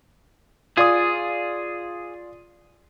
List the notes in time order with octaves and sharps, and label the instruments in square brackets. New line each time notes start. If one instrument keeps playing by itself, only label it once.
[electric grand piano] F4 D5 D#6 [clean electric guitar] G#4